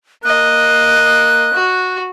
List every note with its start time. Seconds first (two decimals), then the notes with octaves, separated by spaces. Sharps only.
0.24 A#3 D#5 F#6
1.54 F#4